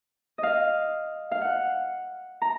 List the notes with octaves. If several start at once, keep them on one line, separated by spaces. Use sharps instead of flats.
D#5 F5
F5
F#5
A#5